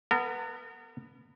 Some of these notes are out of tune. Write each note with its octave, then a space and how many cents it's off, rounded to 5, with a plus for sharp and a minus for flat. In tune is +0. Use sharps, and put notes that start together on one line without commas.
B3 +0 A#4 -40